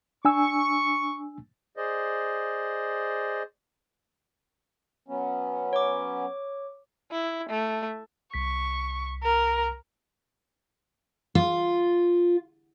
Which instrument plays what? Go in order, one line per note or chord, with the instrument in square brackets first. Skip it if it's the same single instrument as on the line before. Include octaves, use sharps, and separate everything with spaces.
[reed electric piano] D4 G#5 E6 [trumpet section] C#6
[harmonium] G#4 C5 D5 D#5
F#3 B3 C#4
[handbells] C#5 D6
[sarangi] E4
A3
[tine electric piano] C2 B6 [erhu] C#6
[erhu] A#4
[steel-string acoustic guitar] F4